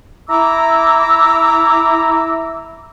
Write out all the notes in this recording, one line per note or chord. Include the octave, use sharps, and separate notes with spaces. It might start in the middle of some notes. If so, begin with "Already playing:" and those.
E4 A#5 D6 E6